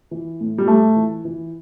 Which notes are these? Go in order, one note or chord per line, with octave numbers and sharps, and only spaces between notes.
E3
A2
G3
A2 A3
E3
E3